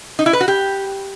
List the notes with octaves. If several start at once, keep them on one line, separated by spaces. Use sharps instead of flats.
D#4
E4
B4
F#4
G4